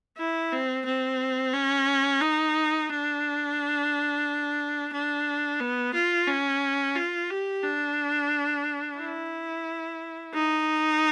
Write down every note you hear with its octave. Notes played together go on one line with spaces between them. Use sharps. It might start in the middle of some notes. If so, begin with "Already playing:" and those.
E4
C4
C4
C#4
D#4
D4
D4
B3
F4
C#4
F4
G4
D4
E4
D#4